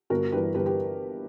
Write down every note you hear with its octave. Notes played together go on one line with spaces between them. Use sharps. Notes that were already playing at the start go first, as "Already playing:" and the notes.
G1 F#4 A#4
G2 E3 G4 B4
G1 G4 B4
G4 B4